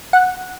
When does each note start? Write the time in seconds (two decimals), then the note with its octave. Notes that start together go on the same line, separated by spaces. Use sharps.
0.13 F#5